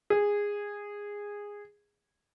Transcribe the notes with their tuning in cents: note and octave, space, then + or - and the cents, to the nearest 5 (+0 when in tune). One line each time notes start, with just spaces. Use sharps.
G#4 -15